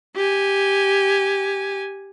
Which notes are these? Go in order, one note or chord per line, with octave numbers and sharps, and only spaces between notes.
G4 G#5